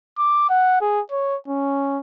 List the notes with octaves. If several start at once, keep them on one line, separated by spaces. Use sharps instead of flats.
D6
F#5
G#4
C#5
C#4